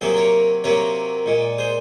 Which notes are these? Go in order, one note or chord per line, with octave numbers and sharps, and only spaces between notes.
C3 F#3 A#3 G#4 C5
A#4 C#5
C3 F#3 A#3 A#4 C#5
A#2 G#3
G#4 C5